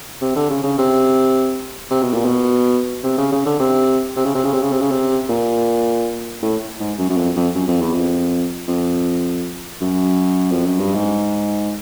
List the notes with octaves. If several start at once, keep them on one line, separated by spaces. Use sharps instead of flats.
C3
D3
C#3
C#3
C3
C3
B2
A#2
B2
C3
C#3
C#3
D3
C3
C3
C#3
C3
C#3
C3
C#3
C3
C#3
C3
A#2
A2
G#2
F#2
F#2
F2
F2
F#2
F2
E2
F2
F2
F#2
F2
F#2
G2
G#2